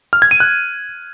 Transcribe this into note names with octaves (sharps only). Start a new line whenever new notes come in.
F6
G#6
D#7
F#6